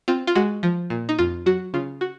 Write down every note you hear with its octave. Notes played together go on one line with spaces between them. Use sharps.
C4 F4
F4
G#3 F#4
F3
A#2
D#4
F2 F4
F#3 F#4
C#3 F4
F#4